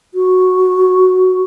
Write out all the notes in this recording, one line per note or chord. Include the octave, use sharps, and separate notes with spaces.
F#4